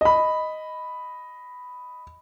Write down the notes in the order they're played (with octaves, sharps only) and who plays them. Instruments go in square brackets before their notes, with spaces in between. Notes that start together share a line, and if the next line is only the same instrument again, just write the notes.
[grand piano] D#5 B5